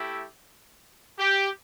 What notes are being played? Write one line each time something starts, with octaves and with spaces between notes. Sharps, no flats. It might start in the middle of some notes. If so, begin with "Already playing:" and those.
Already playing: A3 E4 G4
G4